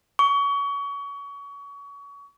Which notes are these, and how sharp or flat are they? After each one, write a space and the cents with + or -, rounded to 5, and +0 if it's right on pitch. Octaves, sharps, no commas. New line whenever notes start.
C#6 +30